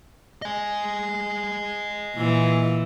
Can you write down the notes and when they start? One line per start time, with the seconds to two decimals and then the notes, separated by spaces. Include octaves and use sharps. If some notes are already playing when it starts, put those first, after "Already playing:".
0.42 D#5 G#5
2.16 A#2 E3